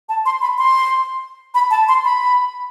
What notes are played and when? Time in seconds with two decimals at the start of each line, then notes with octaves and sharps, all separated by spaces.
0.09 A5
0.26 C6
0.42 B5
0.58 C6
1.54 B5
1.71 A5
1.88 C6
2.04 B5